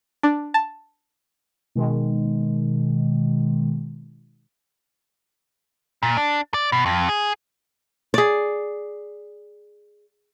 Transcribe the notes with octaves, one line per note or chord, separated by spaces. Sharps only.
D4
A5
B2 D#3 G#3
A#2
D4
D5
B2
F2
G#4
G#4 D5